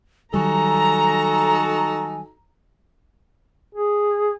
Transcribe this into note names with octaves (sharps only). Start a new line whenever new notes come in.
D#3 F#3 G3 D#4 F#4 A4 G#5 A#5
G#4